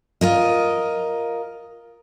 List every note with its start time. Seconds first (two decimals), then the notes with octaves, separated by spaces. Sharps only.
0.21 F4 A#4 D#5